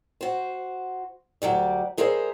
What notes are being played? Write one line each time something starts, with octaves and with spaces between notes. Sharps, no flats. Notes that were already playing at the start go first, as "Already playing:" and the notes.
F#4 C5
D2 F#3 G3 D5
G3 G#4 A#4 C5 E5